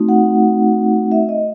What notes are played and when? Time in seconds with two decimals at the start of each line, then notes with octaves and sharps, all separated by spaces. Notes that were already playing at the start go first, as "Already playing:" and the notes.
Already playing: A3 C4 D#4 F#4
0.09 F#5
1.12 E5
1.29 D#5